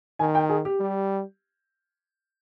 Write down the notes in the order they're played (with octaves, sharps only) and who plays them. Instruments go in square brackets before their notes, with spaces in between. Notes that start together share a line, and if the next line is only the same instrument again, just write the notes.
[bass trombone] D#3 [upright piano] G#5
[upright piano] G5
G#4
G4
[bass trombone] G3